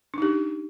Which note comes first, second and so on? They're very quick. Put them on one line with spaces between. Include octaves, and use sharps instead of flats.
D4 D#4 G4